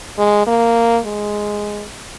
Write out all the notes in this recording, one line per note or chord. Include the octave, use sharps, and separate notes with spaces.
G#3
A#3
G#3